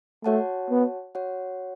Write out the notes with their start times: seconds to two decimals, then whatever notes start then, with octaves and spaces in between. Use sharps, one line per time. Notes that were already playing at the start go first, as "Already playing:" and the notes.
0.24 A3 F#4 C#5 F#5 A5
0.70 B3
1.15 F#4 C#5 F#5